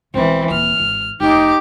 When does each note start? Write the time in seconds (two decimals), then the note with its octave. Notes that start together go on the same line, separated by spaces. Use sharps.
0.14 B1 E3 G#3 C4
0.50 D#1 C4 F6
0.79 G#1
1.20 F1 D#4 G4 D6